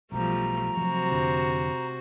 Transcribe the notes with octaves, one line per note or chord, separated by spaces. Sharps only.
B1 B2 F3 G3 A3 A#5
C3 F3 F#3 F#4 C5
F2 D3